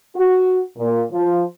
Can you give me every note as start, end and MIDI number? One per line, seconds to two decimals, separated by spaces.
0.16 0.60 66
0.77 1.02 46
1.12 1.43 53